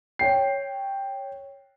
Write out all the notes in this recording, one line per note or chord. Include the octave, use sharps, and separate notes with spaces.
C#5 G5 C7